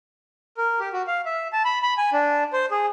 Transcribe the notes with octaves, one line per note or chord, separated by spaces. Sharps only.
A#4
G4
F#4
F5
E5
A5
B5
B5
G#5
D4
C5
G#4